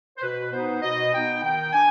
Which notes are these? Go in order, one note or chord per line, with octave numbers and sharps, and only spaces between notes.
C5
B2 B4
B3 D#4 C5
B2 D#5
B3 D#4 G5
D#3 G5
D4 G#5